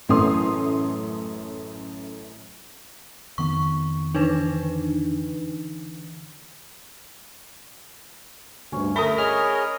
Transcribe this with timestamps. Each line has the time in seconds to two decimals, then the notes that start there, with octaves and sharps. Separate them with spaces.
0.09 A1 F#2 A3 C#4 C6 D#6
3.38 F2 D#3 B3 C#6
4.15 D3 E3 D4 D#4 B4
8.72 D2 G2 C#4
8.96 A3 A#4 B5 D#6
9.18 G#4 C#5 D#5 F6